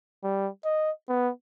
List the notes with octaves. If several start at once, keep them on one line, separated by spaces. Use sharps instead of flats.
G3
D#5
B3